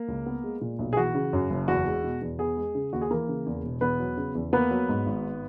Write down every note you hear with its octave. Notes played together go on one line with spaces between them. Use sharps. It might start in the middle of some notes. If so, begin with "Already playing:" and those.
Already playing: A#3
C#2
B3
G#3
A#2
B1
G#4
E3 F#4
C#3
F#2
F#1
E2 F#4
G#3
B2
E2
B3 G#4
G#3
C#3
D#2 F#4
G#4
E3 A#3 A#4
C#3
E2
E1
E2 B3 B4
F#3
C#3
E2
A#3 B3 B4
F#3
G#2
G#1